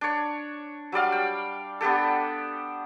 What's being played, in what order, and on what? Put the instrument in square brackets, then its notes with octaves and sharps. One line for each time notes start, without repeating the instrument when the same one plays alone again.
[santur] D4 C#5
F#3 G3 D5 F5
G5
B3 D4 G4 A4